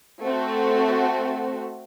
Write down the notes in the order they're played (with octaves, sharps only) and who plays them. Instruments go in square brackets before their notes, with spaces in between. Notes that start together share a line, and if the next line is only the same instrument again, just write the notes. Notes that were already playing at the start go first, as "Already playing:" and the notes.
[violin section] A3 C4 F#4